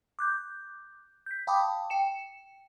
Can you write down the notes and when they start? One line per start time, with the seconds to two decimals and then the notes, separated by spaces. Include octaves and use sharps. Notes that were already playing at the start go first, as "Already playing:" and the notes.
0.19 D6 F#6 G6
1.26 G6 B6
1.47 F5 G5 A5 B5 D6 D#6
1.90 G5 C#7 E7